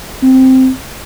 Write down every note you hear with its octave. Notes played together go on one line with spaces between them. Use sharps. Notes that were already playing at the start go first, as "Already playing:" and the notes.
C4